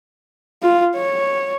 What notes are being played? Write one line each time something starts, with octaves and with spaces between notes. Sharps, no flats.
F4
C#5